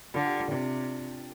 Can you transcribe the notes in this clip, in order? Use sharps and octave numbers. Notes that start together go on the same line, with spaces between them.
D3 F4
G4
F4
C3 D4